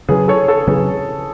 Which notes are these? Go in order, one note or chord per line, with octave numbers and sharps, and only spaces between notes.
C#3 F#3 C#4 G#4 B4
A4 C#5
A4 C#5
C#3 F#3 C#4 G#4 B4